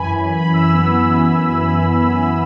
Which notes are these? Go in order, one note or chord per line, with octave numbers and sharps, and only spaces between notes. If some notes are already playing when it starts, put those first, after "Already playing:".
Already playing: F#2 E3 G#5 B5
F#2 G#5
B5
F#2
E6
B3
E3